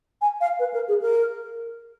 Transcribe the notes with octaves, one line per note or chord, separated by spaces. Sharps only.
G#5
F5
B4
A#4
G#4
A#4